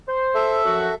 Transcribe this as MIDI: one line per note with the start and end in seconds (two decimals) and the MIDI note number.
0.08 0.60 72
0.35 0.95 69
0.35 0.95 76
0.65 0.90 42
0.65 0.90 53
0.65 0.90 66